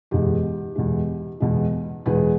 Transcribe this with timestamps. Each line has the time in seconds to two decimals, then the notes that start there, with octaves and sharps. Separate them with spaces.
0.11 E2 B2 G#3 G4
0.76 E2 B2 G#3
1.40 E2 B2 G#3
2.06 E2 B2 G#3 G#4 B4